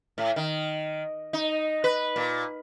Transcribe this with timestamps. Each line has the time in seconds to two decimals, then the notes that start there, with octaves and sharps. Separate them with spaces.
0.18 A2
0.36 D#3
1.33 D#4
1.84 B4
2.16 A#2